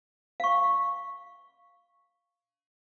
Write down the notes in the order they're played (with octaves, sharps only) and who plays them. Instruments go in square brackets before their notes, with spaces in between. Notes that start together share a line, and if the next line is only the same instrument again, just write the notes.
[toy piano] F5 C#6